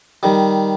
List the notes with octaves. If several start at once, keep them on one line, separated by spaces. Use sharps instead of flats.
D#3 G3